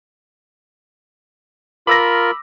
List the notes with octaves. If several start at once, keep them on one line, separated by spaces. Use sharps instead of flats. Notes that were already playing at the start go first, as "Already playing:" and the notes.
F4 A#4 B5 D6 E6 A#6